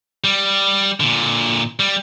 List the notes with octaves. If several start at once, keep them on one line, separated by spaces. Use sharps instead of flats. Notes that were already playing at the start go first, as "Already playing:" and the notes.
G3
A#2 D3
G3